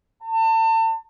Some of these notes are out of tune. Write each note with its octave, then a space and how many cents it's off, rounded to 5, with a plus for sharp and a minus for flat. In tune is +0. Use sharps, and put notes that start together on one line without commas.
A5 +35